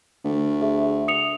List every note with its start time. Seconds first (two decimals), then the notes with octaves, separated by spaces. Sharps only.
0.25 D2
0.62 G#4 E5
1.08 D#6 C#7 F7